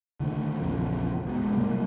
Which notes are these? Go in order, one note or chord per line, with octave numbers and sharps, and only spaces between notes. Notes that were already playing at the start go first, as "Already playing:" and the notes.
D3 D#3 A3
A#1 E2 C#3 F3
G#2 B2
C2 F#3 G3 A#3